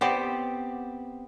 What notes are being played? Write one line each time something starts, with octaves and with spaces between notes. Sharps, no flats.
B3 C4 G4 D5